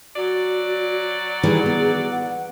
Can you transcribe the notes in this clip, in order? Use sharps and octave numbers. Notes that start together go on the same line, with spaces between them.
F#3 F#4 D5
D#3 E3 G3 G#4
B3
F#5